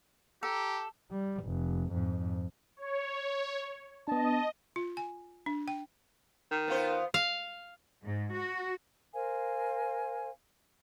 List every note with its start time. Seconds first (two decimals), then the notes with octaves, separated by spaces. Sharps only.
0.43 G4 A4 A#5
1.11 G3
1.44 F1
1.92 F2 G#2
2.77 C#5
4.08 B3 D4 D#5 A5
4.76 F4
4.97 G#5
5.46 D4
5.68 G5
6.51 D#3
6.68 B3 F4 C5
7.14 F5
8.04 G#2
8.36 F#4
9.13 A#4 C5 F5 G#5